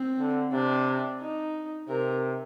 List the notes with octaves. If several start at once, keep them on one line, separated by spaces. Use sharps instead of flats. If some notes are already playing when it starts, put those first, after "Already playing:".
Already playing: C4
D3
C3 D4
D#4
C3 A#4